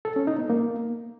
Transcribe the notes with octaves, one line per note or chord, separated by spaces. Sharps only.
A4
C#4
D#4
B3
A#3